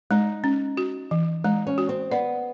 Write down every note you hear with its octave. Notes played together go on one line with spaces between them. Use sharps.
G#3 D#4
C#4
F#4
E3
G#3 D#4
C#4
F#4
C4
B3 D5